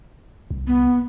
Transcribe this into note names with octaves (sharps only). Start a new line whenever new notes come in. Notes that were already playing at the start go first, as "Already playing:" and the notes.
C2
B3